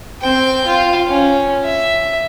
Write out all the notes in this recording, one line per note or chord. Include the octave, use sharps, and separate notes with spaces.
C4 G5
F4
C#4
E5